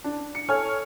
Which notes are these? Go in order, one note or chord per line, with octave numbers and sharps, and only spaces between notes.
D4
C#7
A4 C#5 G#5 F6